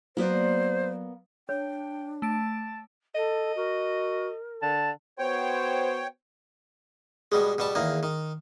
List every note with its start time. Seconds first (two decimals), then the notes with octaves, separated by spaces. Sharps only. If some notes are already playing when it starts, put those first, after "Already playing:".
0.17 F#3 A#3 B3 C5 D5
1.49 D4 C#5 G5
2.22 A3 A5 D7
3.15 A4 D#5
3.56 F#4 A#4
4.62 D3 A5
5.19 B3 F#4 C5 C#5 G5
7.32 B2 G3 G#3 G#4
7.58 B2 G3 A5
7.75 E2 D#3 A#3
8.03 D#3